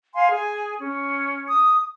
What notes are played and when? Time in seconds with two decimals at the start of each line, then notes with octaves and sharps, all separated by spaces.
0.14 F5 G#5 C6
0.30 G#4 G#5
0.78 C#4
1.49 D#6